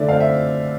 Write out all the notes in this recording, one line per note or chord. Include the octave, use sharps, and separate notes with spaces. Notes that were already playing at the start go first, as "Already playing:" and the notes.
Already playing: D3 F3 A3 D5 E5
C4 F5
E5